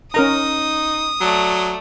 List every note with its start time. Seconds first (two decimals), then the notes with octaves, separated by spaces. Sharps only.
0.14 C#4 D#4 A#4 A#5 D#6
1.21 F#3 A3 D5